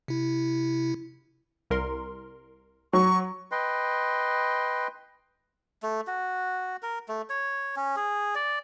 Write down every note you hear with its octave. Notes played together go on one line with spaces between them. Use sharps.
C3 E4
C2 A#4 C6
F#3 C#6
B4 D#5 G5 C6
A3
F#4
A#4
A3
C#5
C#4
G#4
D5